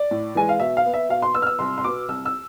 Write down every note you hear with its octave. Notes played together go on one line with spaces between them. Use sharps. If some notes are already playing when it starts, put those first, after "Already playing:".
Already playing: D5
A2
E3 G#3 G#5
F5
B2 E5
F5
B3
E5
B2 F5
C6
B3 E6
F6
E6
C2 C6
C6
B2 B3 D6
C2 E6
E6